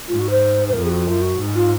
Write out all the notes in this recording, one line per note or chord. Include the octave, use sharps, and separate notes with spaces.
G#2 F4
F#4
C5
C5
F2 A#4
G#4
F#4
F#2 F4
F#4
G#2
F4